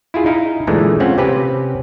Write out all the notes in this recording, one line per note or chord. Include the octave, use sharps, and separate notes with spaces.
E4 F4 G#4
D#4 E4 F5
A#2 D3 E3 G#3 A3
C4 C#4 F4 F#5
C3 C4 C#4 G4 B4